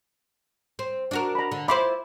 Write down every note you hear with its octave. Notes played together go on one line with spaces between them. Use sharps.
C4
D4 F#4 A#4
A#5 B5
D3
E4 F4 C5 B5 C6 D6